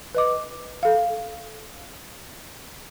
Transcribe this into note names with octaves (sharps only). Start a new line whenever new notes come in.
B4 D#5 D6
A4 F5